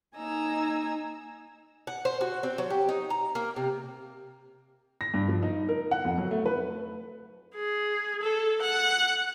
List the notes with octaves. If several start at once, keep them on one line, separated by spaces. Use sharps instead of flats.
A#3 D#4 G#5 A#5 E6
F#5
C5
F#4
C4
F#3
G4
D#4
A#5
A#3
C3
A#6
G2
F3
D#4
A#4
F#5
F2
F#3
A3
B4
G#4
A4
F#5